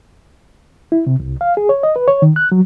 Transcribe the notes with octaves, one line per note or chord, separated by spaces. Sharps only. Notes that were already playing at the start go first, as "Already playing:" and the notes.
E4
C3
C2
F5
G#4
C#5
D#5
B4
C#5
D#3
F#6
F#3